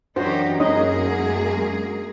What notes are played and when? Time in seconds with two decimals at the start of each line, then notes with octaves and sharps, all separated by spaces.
0.16 F#2 E3 D4 D#4 G4 C5 C#5 F#5
0.60 G#3 A#3 C#4 D#4 G#4 D#5